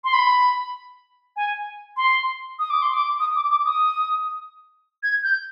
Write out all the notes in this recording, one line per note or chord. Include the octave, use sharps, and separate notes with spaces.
C6
B5
G#5
C6
D#6
D6
C6
D6
D#6
D6
D6
D#6
G#6
G6